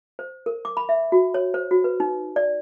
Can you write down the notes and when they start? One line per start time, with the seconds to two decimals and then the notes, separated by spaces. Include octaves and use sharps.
0.19 C5
0.46 A#4
0.65 D6
0.77 B5
0.89 E5
1.12 F#4
1.34 C#5
1.54 C5
1.71 F#4
1.84 B4
2.00 D#4
2.36 D5